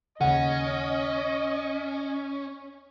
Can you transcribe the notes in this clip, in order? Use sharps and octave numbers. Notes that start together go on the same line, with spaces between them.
D#2 C#3 C#4 D#5 F#5